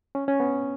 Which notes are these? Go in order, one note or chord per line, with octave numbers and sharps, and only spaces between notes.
C#4
C#4
B3